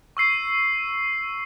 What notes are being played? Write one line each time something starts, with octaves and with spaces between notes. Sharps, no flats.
C#6 E6 C7 D#7